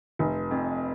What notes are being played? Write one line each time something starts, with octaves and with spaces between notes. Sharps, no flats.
F1
F2